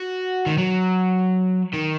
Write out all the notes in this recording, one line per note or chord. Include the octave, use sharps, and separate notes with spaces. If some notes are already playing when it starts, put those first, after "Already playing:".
Already playing: F#4
D#3
F#3
D#3